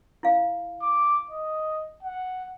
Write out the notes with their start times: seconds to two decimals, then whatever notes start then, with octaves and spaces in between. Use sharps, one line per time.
0.23 E4 F5
0.82 D6
1.31 D#5
2.03 F#5